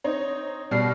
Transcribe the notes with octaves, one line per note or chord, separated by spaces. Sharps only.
C4 D#4 C#5
B2 G3 F6 C7